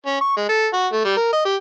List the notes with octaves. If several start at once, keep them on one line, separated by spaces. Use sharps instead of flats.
C#4
C#6
G#3
A4
F#4
A3
G3
A#4
D#5
G4